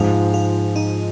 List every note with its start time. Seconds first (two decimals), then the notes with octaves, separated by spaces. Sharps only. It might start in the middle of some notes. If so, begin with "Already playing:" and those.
Already playing: G#2 F3 G#3 F4
0.34 F4
0.76 D#4